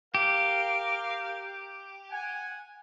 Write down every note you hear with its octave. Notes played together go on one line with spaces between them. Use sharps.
G4 A#4 F5
F#5 G#5